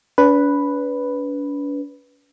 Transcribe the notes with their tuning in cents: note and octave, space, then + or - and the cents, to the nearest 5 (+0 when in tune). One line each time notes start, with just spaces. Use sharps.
D4 -45 B4 +0